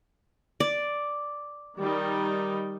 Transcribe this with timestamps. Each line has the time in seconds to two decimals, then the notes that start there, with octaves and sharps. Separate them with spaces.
0.60 D5
1.80 D#3 G3 D#4